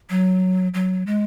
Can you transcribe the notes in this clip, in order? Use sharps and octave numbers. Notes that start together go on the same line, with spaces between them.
F#3
F#3
G#3